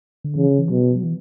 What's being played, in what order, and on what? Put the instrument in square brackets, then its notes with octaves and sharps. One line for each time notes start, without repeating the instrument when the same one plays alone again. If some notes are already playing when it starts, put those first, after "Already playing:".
[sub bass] D3
[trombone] C#3 [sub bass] E3
[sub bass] E3
[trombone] B2 [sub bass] F#3
[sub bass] F#3
E3